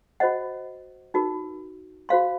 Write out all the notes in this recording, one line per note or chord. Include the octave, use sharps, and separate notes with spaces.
F#4 C5 D#5 F#5
D#4 F#4 A#4
F#4 C5 F5 C6